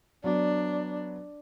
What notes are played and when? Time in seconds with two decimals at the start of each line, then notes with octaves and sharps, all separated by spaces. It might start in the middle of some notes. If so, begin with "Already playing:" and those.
0.24 F#3 B3 D4